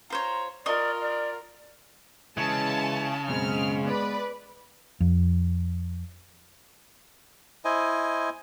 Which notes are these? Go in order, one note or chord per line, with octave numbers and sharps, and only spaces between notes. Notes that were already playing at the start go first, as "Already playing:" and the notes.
F4 C5 C#5 A#5
F4 A#4 D5 D#5 C#6
D5
C#3 E3 G#3 E4 A5
F#2 B2 G#3 C4 F6
B3 B4 D5 B5
F2
E4 C5 D#5 G#5